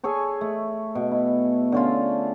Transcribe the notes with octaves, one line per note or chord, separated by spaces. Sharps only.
G#4 A4 C#5 G#5
A3
B2
E4
D3 C#4 F4